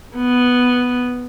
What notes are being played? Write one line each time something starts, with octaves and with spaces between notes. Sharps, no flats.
B3